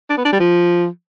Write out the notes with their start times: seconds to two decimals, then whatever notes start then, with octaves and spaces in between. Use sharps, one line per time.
0.10 D4
0.17 B3
0.25 D4
0.32 G3
0.40 F3